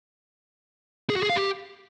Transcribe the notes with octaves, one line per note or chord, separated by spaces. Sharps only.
G#4
F#4
G#4
F5
G4